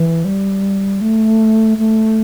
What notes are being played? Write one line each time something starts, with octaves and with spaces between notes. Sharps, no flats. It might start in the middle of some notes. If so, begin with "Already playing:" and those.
Already playing: E3
G3
A3
A3